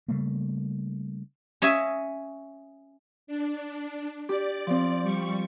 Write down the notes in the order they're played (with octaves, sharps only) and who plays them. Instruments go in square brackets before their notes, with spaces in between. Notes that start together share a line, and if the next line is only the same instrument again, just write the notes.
[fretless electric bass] C#3 G3 A3 A#3
[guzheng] C#4 C#5 D#5 E5 G#5
[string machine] D4
[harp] G4 D6 [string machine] D5
[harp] F3 C4
[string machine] G3 C#6